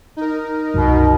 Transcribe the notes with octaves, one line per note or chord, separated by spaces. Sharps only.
D#4 A#4
C2 F#2 B2